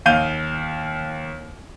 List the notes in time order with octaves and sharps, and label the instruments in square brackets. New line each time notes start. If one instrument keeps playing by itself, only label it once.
[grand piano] D#2 F5 G6 D#7